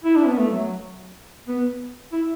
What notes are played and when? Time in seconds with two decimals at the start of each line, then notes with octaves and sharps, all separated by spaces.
0.04 E4
0.16 D4
0.27 B3
0.39 A3
0.50 F#3
1.48 B3
2.13 E4